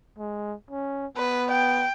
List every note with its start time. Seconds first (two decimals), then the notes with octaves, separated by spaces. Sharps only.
0.19 G#3
0.71 C#4
1.18 B3 B4
1.51 G5